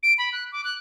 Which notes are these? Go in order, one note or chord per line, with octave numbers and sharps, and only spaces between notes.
D7
B5
F#6
D6
F#6